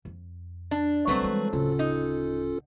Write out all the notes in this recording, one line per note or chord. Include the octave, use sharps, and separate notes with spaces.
F2
D4
D2 F#3 G3 A3 C4 B4
E3 G#3
D1 C#3 C#4 F4 A4
D#4